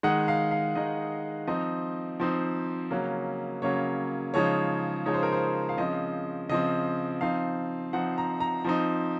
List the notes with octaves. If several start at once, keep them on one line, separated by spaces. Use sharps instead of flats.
D#3 G#3 D#4 F#5
F5
F5
D#3 G#3 D#4 D#5
F3 C4 D#4 D#5
F3 C4 D#4
C#3 F#3 A#3 C#4
C#3 F#3 A#3 C#4 C#5
C#3 F3 G#3 D#4 C#5
C#3 F3 G#3 D#4 C#5
C5
A#4
C5
F5
C#3 F3 C4 D#5
C#3 F3 C4 D#5
F3 C4 D#4 F5
F3 C4 D#4 F#5
A#5
A#5
F3 C4 D#4